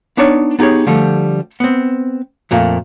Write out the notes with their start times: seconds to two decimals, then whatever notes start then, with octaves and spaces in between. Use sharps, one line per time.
0.17 B3 D4 D#4 C#5 D5
0.59 B3 D#4 G4 G#4 C#5
0.87 D3 F3 G3 A3
1.60 B3 C4
2.51 F2 A#2 A3 A#3